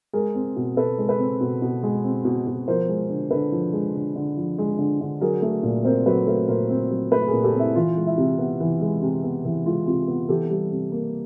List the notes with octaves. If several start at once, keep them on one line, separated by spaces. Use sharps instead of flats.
G#3 G#4 A#4
C4
B2
B2 A4 B4
G#3
A4 B4
C4
B2
B2
G#3
C4
B2
B2
F3 A#4 C5
G#3
D3
D3 A4 B4
F3
G#3
D3
D3
F3
G#3
D3
D3
F#3 G#4 A#4
A3
A#2
C4 A#4 C5
F#3 A4 B4
A3 A#4 C5
A#2 A#4 C5
C4
F#3
A3 A4 B4
G#4 A#4
A#2
G4 A4
C4
E4
E3 F4
G#3
E4
C3
B3
E3
G#3
C3
B3
E3
G#3 F4
C3 F4
B3
E3 G4 A4
G3
C3
A#3